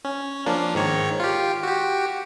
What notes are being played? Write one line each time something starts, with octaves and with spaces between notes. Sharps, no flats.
C#4
F3 A#3 D4
G#2 D#3 C#5
F4 G4
F#4 G4